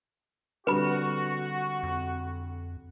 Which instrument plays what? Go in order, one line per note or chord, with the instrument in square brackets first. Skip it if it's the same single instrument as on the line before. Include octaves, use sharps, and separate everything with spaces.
[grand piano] D3 G3 C4 [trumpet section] F#4 [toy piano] B4 B5
[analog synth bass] F2